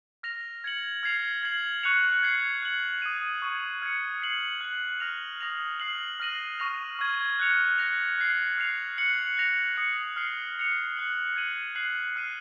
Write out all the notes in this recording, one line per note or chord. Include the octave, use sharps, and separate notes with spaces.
F6 A#6 F7
G#6 C#7 F#7
F6 G#6 C7 F7
G#6 C7 F#7
C#6 F#6 C#7 F7
G#6 C7 F#7
F#6 C#7 F#7
D#6 G#6 D#7
C#6 G#6 C#7
F6 G#6 C#7
G#6 C7 F#7
F#6 C#7 F#7
F6 A#6 F7
D#6 A#6 F7
F6 C7 F#7
F6 A#6 D#7 F#7
C#6 F6 A#6 F7
C#6 F6 G#6
F#6 C#7 F7
F#6 A#6 F7
F#6 C7 F#7
F6 C7 F7
F#6 C#7 F#7
F#6 A#6 F7
D#6 A#6 C#7
F6 C7 F#7
F#6 C#7 F7
F#6 C#7 F#7
G#6 D#7 F#7
F#6 C7 D#7 F#7
F6 C7 D#7